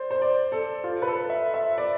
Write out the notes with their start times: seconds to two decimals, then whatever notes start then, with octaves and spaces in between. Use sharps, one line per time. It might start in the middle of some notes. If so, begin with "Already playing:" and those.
Already playing: C5 D5
0.11 C5
0.22 D5
0.52 A4
0.84 F4
1.02 B4
1.07 A4
1.30 E5
1.54 E5
1.78 D5